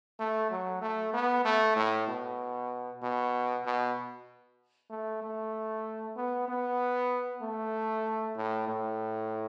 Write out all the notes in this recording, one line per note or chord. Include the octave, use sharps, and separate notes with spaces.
A3
F#3
A3
B3
A3
A2
B2
B2
B2
A3
A3
B3
B3
A3
A2
A2